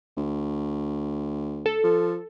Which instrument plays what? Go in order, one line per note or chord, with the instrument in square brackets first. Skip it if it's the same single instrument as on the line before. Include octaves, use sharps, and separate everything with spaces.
[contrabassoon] D2
[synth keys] A4
[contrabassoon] F3